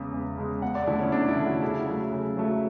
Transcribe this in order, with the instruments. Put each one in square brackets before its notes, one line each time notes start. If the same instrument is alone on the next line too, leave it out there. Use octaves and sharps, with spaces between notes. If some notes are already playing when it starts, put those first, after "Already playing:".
Already playing: [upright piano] E2 C#3 G#3
E2
C#3 G#3
E2 F#5
D5
D3 A3 E4
C#4
E2 D4
E4
D3 A3
F#4
C#3 E4
F#3 A3
C#3
F#3 A3